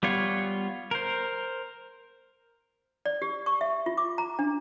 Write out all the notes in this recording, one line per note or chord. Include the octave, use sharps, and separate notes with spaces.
G3 B3 F4 C#5
A#4 C5
D5
G4
C#6
E5
F4
D6
A#5
D4